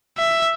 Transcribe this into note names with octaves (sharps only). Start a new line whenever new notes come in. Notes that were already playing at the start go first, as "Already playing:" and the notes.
E5